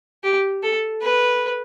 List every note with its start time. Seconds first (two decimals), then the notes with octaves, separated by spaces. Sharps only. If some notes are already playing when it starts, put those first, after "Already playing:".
0.24 G4
0.63 A4
1.01 B4